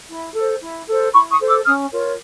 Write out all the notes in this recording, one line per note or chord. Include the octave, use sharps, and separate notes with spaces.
E4
A4 C5
E4
A4 C5
E4 B5 C#6
C#6 D#6
A4 C5
D6 E6
C#4 D#6 F6
F4 A#4 C#5